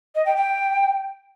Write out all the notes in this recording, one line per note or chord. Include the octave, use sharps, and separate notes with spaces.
D#5
G5
G5